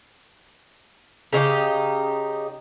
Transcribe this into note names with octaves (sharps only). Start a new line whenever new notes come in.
C#3 D#4 F#4 G4